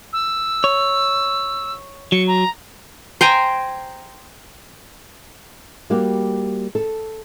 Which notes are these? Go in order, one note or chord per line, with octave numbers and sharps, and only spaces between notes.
E6
C#5
F#3 C#7
A#5
C5 G5 G#5 A#5
G3 A#3 F#4 G4
A4